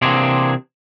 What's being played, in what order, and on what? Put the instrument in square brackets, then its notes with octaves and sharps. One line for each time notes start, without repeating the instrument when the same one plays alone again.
[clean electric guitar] C3 E3 A#3 C4 D4 G#4